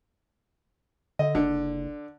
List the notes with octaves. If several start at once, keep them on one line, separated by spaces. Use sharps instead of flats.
D3 D#5
F#1 D3